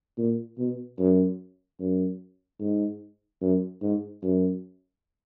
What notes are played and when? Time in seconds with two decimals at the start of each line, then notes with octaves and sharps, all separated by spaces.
0.18 A#2
0.58 B2
0.99 F#2
1.80 F#2
2.60 G#2
3.41 F#2
3.82 G#2
4.23 F#2